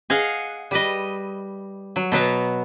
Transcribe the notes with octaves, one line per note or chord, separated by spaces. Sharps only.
G#4 D#5 F5 F#5
G3 B4 D#5
F#3
B2 F#3 B3 A#5